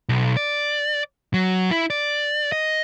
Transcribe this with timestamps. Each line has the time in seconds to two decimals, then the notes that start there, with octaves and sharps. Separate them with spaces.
0.09 B1
0.37 D5
1.34 F#3
1.71 E4
1.90 D5
2.52 D#5